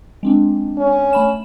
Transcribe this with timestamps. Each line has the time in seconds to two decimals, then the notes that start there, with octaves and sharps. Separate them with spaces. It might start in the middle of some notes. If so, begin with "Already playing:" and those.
0.23 G#3 C4 D4
0.78 C#4
1.13 A3 B5 E7